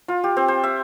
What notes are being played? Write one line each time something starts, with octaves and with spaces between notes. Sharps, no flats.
F4
G4
C4
C5
E5